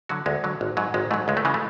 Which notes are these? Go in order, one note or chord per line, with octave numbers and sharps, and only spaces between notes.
D3 F#3 F#4
D2 G#3
D3 F#3
G#1
G#2 F#3
G#1 G#3
G#2 F#3 A3
C#2 G#3
A3
C#3 E3 G#3
A3